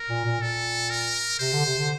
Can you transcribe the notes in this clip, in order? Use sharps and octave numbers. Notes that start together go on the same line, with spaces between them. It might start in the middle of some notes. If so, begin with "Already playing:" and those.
Already playing: A#4
A#2
A#2
A#2 A4
A#4
C3 C5
D3
C3
D3